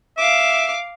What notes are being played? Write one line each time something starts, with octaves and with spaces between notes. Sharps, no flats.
E5 F5 D6